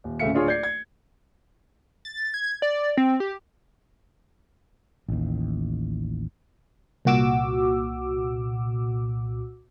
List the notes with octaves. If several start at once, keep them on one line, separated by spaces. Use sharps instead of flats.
D#1
D1 C#3 A3 E5 F5 C#7
D1 D4 F4 G#4 C#5
D5 G6 G#6 C7
G#6
A6
G#6
D5
C4
G4
A1 D#2
C2 A#2 F#4 D6 E6